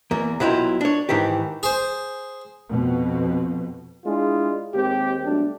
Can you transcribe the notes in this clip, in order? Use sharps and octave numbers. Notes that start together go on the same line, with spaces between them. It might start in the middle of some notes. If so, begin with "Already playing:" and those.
E2 A#3
B1 F#3 E4 F4 G5
D4 C#5
G#2 D#3 E3 G4
G#4 C5
F2 B2
G#3 D4 E4 F4 G#4
D#2 G#3 C4 G4
B2 F#3 G3 A3 D4